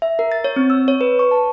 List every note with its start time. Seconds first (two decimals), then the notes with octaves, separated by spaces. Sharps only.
0.02 E5
0.19 A#4
0.32 A6
0.44 C#5
0.56 C4
0.70 E6
0.88 C#5
1.01 B4
1.19 C#6
1.31 A5